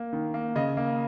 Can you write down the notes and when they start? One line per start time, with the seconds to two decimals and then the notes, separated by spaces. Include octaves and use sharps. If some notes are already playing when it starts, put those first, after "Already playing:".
Already playing: A#3
0.13 D#3
0.34 A#3
0.56 C#3 D#5
0.77 A#3